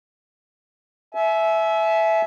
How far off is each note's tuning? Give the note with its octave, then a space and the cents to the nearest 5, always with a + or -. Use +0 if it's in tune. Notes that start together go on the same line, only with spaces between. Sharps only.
E5 +0 G#5 +40